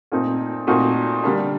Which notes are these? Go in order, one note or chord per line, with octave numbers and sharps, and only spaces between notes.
A#2 A3 C4 D#4
A#2 A3 C4 D#4 F#4
D3 G3 A#3 D4